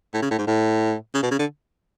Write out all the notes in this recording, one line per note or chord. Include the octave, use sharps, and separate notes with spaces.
A2
C#3
A2
G#2
A2
C#3
B2
C#3
D3